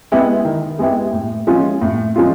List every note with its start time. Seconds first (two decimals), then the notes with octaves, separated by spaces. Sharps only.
0.12 G#3 B3 E4 G4
0.45 D#3
0.79 G#3 B3 E4 G4
1.13 A2
1.47 F3 G#3 C#4 F4
1.82 A2
2.16 F3 G#3 C#4 F4